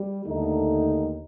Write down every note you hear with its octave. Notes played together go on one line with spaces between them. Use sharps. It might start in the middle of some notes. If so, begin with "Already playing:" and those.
Already playing: G3
D#2 D3 A3 D#4